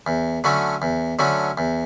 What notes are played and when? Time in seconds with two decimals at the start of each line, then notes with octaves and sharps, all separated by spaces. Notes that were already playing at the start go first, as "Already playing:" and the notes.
0.07 E2
0.44 D3 F#3 A3 C#4
0.82 E2
1.19 D3 F#3 A3 C#4
1.58 E2